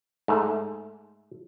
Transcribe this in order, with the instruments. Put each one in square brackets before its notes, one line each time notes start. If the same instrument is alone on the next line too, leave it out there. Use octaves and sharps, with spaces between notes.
[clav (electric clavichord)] G#2 A3